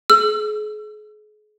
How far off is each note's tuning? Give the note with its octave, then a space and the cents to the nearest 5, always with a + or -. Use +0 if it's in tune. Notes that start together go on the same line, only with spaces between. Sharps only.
G#4 +40 E6 +35